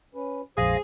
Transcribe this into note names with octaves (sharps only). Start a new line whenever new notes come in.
C#4 B4
A#1 F2 G#3 G#4 C5 F5 A#6